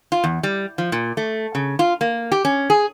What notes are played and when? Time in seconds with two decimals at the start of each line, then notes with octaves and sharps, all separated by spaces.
0.12 F4
0.24 E2
0.43 G3
0.78 F3
0.92 A#2
1.17 A3
1.55 C#3
1.79 F4
2.01 A#3
2.32 G4
2.45 C#4
2.70 G#4